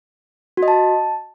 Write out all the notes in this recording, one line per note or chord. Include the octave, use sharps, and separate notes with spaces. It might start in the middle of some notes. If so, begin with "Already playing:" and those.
F#4
D#5
A5